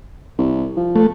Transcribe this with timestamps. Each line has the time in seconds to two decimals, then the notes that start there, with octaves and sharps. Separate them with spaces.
0.38 C2
0.77 F3
0.96 A3